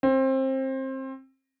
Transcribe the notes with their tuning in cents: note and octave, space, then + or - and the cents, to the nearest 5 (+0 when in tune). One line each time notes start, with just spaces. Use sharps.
C4 +25